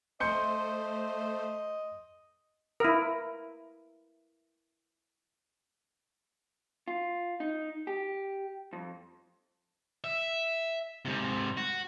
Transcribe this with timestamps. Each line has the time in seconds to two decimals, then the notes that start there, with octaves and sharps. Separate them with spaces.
0.20 A3 C5 D#5 C6 G6 C#7
2.80 E4 A#4
6.88 F4
7.40 D#4
7.87 G4
8.73 F2
10.04 E5
11.05 G#2 C3
11.57 F#4